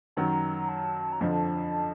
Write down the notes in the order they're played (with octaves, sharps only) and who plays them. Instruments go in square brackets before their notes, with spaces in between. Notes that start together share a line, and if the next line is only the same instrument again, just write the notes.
[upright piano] F#2 D#3 F#3 [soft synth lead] A#5
[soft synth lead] A5
A#5
[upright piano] F2 D3 F3 [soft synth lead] A5